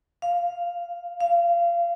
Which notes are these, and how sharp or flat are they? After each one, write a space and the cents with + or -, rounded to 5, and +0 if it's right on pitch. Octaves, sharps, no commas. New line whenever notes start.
F5 +0
F5 -25